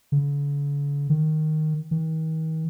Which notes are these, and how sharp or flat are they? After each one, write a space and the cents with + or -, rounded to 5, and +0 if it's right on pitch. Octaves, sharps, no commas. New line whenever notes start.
D3 -45
D#3 -5
D#3 +40